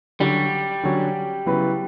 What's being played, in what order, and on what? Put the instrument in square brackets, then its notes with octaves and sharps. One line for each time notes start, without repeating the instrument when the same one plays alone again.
[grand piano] D3 F#3 C#4 F#4 [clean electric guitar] G3
[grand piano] D3 F#3 C#4 F#4
C#3 F#3 B3 E4 B4